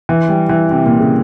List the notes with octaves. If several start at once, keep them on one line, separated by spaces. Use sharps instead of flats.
E3
G3
E3
C3
A#2
C#3